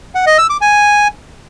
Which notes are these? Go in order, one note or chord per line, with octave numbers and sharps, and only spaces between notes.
F#5
D#5
E6
D6
G#5